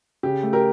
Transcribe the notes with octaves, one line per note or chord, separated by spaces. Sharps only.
C#3 G4
A3
G4 A#4